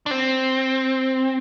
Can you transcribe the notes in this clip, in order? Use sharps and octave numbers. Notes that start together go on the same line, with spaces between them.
D4
C4